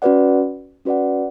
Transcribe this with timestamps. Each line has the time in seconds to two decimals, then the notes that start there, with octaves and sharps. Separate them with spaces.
0.02 C#4 F#4 B4 D5 F#5
0.85 C#4 F#4 B4 D5 F#5